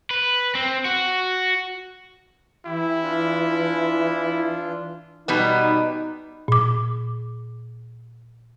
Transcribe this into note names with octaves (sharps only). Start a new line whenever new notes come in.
B4
C4
F#4
E3 E4 G4
D4 F4
B2 G3 B3 D#4
A#2 D6